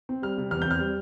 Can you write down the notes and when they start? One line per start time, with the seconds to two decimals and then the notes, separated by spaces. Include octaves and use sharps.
0.09 C4
0.22 G3 F6
0.38 C3
0.51 E2 F6
0.62 G6
0.66 C4 F6
0.80 G3